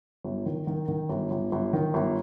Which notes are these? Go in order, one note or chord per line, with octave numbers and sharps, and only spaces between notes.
G1
D#3
D#3
D#3
G1
G1
G1
D#3
G1